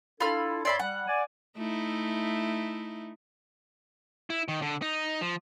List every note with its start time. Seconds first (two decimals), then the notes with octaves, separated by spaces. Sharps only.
0.20 D4 E4 F4 A4 B5 F6
0.65 G2 C#5 D5 E5 B5 C6
0.79 G3 F#5
1.07 D5 G#5
1.57 A3 D#4 E4
4.30 E4
4.48 D#3
4.62 D3
4.82 D#4
5.21 F3